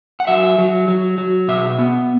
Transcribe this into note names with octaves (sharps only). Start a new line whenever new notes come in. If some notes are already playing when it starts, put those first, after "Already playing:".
F#5
F#3 E5
F#3
F#3
F#3
B2 E5
B3